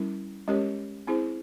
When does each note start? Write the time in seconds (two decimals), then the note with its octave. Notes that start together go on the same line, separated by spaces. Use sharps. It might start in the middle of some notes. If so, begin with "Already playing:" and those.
Already playing: G3 C#4 E4 A#4
0.48 G#3 C#4 G4 A#4 C#5
1.07 C4 E4 G#4 C5